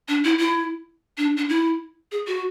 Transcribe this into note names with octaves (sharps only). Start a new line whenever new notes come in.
D4
E4
E4
D4
D4
E4
G#4
F#4